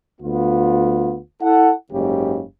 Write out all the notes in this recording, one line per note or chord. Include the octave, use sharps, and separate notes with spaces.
D2 B3 F4
E4 A4 F#5
F#1 G#2 C#3 G4